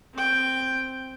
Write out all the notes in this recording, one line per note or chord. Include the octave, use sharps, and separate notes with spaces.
C4 G5